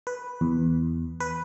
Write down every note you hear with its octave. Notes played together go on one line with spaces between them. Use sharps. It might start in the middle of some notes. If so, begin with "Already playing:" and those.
B4
E2
B4